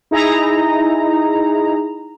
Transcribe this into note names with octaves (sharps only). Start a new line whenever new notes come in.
D#4 E4 G#4 A#5